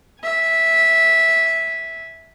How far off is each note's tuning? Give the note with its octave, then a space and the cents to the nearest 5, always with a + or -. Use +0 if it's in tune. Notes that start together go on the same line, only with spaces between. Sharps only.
E5 -10 G#5 +0